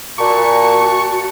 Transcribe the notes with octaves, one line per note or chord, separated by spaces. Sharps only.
A#2 F#4 A5 C#6